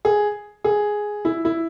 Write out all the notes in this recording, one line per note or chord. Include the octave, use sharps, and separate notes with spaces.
G#4
G#4
E4
E4